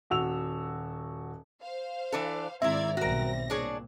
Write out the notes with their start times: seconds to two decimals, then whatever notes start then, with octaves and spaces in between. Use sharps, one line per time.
0.10 D#1 F#4 E6 F7
1.61 C5 F5
2.12 E3 D4 A4
2.62 G#2 D#3 C4 E4 D5 E5 A#5 G#6
2.97 B1 D#3 G3 C4 F#4 A#4 A#6
3.50 A#2 D4 G#4 C#5